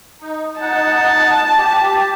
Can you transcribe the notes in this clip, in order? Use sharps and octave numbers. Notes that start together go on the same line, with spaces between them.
D#4
D#4 F#5 A5
G4